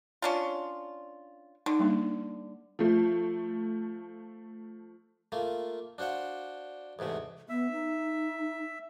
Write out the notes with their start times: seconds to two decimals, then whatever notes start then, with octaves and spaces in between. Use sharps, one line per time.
0.22 C#4 D4 F4
1.66 D3 D#4
1.79 G3 A#3 D4
2.79 F3 A3
5.32 A3 A#3 F4
5.98 D4 F#4 C5 F5 F#5
6.99 E2 G#2 C3 A3
7.49 B3 E5
7.72 D#4